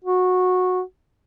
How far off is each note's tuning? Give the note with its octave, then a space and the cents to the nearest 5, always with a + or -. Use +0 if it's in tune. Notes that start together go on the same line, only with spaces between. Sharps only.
F#4 -15